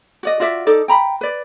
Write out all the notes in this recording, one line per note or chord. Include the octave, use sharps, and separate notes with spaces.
F#4 D5 D#5
F4 F#4 D5 E5
D#4 A4 D5
G5 A#5 B5
B4 D5